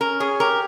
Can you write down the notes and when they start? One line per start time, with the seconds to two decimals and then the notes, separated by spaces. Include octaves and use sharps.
0.01 C#4 A#4
0.20 G#4 C#5
0.40 G4 A#4